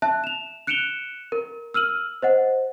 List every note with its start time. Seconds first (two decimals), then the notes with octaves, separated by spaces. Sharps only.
0.02 E5 A5 F#6
0.24 E7 F7
0.67 F#6 C#7 D7 E7 F7 G7
1.32 A#4
1.74 E6 F6 D#7 F#7
2.22 C5 D#5 F#5